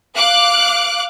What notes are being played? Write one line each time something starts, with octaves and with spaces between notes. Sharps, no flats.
F5 D6 F#6